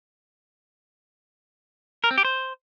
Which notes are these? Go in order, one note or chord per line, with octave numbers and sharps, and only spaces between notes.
A#4
C4
G4
C5